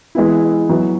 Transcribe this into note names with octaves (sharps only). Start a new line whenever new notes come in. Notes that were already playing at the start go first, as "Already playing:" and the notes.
E3 G#3 B3 E4
F#3 B3 E4